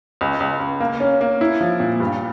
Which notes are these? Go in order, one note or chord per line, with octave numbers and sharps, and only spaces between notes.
C#2
C#2
C#2
A#3
C#4
A#3
E4
F3
A#2
G2